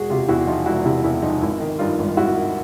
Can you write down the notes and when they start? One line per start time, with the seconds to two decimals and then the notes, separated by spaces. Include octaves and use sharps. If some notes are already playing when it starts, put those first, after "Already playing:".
Already playing: E1 F#4 G#4
0.10 C3 F4 G4
0.28 E2 E4 F#4
0.47 F3 D#4 F4
0.66 E1 E4 F#4
0.85 C3 E4
1.04 E2 E4
1.22 F3 D#4
1.42 G#1 E4
1.60 D#3
1.79 G2 D#4 F4
1.99 G#1
2.17 G#1 E4 F#4
2.36 D#3